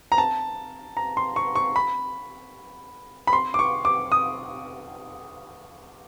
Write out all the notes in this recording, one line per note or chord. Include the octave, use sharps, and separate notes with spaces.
A#5
A5
A#5
C6
C#6
C#6
B5
B5
C6
D6
C#6
D6
D#6